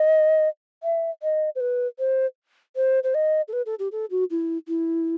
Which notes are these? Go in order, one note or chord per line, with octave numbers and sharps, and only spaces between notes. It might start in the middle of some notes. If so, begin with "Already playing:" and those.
Already playing: D#5
E5
D#5
C5
B4
C5
C5
C5
D#5
A4
B4
A4
G4
A4
F#4
E4
E4